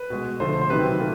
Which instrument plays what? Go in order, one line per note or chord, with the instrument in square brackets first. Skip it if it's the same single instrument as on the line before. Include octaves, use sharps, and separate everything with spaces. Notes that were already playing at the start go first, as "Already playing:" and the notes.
Already playing: [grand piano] B4
B2 G#3
D3 F3 A3 C5
C5
C3 D#3 F#3 A3 B4
A#2 A3